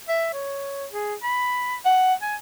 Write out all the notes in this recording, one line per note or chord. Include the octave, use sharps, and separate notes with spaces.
E5
C#5
G#4
B5
F#5
G#5